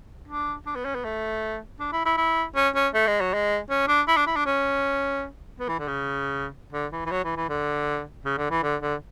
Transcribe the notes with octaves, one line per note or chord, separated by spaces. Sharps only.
D4
D4
B3
C#4
B3
A3
D4
E4
E4
E4
C#4
C#4
A3
G#3
F#3
G#3
C#4
D4
E4
D4
E4
D4
C#4
B3
E3
D3
C#3
D3
E3
E3
F#3
E3
E3
D3
C#3
D3
E3
D3
D3